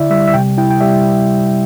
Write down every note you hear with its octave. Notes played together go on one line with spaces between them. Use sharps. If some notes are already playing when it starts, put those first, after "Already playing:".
Already playing: D3 E4 D5 E5
G3 E5
E5
C3 G5
E4 G5
G5
G3 E5